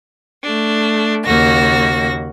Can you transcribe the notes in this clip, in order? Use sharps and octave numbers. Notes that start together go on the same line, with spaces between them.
A3 D4
D#2 C#3 A#3 F#4 A#6